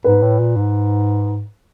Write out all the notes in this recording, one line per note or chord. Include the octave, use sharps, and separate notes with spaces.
G#2 B4
A2
A#2
G#2